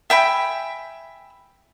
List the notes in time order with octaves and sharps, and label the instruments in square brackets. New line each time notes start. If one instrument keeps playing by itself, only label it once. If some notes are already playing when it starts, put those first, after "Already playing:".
[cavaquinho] E5 G5 G#5 B5